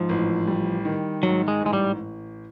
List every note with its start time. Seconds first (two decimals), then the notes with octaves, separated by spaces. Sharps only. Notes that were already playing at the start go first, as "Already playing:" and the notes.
Already playing: G#2 F3
0.09 A1
0.47 G3
0.85 D#3
1.23 G#2 F#3
1.48 G#3
1.61 A1
1.66 G#3
1.73 G3